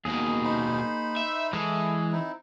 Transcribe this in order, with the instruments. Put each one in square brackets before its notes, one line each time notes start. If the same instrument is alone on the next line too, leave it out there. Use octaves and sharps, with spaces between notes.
[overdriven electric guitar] D#2 B2 [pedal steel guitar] A#3 G#4
[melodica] D#4 C5 B5
[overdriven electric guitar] E5
[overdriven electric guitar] E3 [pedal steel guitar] G#3 G#4 [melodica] A4
[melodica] C4 D#4 E4